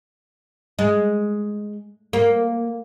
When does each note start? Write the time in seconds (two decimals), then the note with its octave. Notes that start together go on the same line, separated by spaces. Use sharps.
0.79 G#3
2.13 A#3